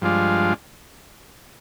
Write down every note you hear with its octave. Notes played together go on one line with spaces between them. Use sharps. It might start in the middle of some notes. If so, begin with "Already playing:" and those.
G2 F3 G#3 D4 F4